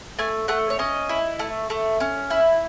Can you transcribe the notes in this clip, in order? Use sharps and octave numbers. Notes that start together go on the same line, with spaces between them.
A3 G#5
A3 F#5
C#5
C#4 D#5
E4
A3
A3
C#4
E4